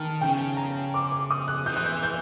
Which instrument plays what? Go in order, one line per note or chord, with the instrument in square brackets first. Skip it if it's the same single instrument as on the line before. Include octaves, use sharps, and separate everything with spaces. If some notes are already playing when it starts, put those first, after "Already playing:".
Already playing: [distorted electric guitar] D#3 [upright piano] A5
[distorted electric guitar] C#3 [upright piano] G5
[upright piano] A#5
D6
D6
D#6
F#6
[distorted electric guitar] E3 [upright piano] G6
[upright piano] F#6
G6
G6